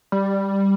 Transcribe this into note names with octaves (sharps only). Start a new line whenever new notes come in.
G3